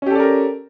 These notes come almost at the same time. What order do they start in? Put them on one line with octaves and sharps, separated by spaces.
C#4 G4 A4 D5 A#4